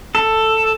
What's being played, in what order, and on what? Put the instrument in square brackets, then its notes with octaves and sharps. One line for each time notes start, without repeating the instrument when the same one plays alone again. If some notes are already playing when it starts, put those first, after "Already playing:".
[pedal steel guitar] A4